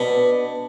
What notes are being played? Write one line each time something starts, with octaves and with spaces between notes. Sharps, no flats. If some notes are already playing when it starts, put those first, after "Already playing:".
Already playing: B2 D4